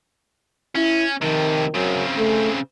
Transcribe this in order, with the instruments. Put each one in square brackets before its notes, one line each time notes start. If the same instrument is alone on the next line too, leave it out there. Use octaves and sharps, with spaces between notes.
[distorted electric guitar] C#4 [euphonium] E4
[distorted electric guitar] C3 F3 [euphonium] D#3
[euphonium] F#2 [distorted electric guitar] C#3 C4
[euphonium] A3